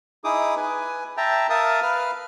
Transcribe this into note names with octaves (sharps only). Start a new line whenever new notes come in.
D#4 E4 G#4 D6 D#6
B4 G#5
E5 G5 A5 A#5
A#4 E5 F5 A5 D#6
B4 F5 F6